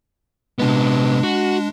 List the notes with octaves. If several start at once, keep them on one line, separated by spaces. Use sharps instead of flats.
C2 G#3 B3 D4
F#4